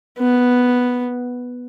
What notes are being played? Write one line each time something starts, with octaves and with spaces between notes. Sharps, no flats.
B3